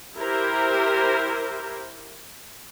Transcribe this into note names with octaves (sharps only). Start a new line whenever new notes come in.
E4 G4 A#4 C5